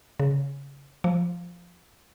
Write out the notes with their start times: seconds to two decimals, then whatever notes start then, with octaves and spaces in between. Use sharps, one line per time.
0.20 C#3
1.04 F3